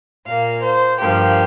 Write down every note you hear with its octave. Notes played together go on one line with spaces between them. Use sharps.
A#2 A#3 F5
C5
G2 F3 A#3 G4